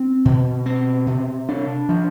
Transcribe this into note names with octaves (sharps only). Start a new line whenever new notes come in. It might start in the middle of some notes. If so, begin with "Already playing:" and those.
Already playing: C4
B2
C4
C3
D4
F3